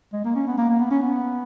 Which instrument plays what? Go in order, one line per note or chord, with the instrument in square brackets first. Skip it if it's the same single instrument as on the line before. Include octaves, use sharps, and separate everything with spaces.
[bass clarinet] G#3
A#3
C#4
B3
A#3
A#3
B3
C#4
B3